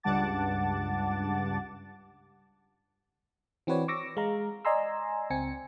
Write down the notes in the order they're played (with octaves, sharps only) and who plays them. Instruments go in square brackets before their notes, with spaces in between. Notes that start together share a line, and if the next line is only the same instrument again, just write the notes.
[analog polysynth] C#2 G2 F#5 A5 D6 A6
[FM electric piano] E3 C4 F#4 B4 C#5 D5
C#6 D6 E6 A#6
G#3 F5 A#5
D5 D#5 G#5 A#5 C6 E6
C#2 C4 G#5 C#7